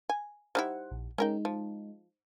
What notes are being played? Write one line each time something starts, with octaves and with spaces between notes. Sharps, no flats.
G#5
G3 D#4 E4 C5 F#5
A#1
G#3 C#4 D#4 A#4 G5
F3